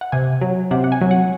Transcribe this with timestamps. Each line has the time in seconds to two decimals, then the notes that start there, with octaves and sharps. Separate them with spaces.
0.01 F#5
0.12 C3 G#5
0.41 F#3
0.71 C3 F#5
0.84 F#5
0.92 G#5
1.01 F#3
1.11 F#5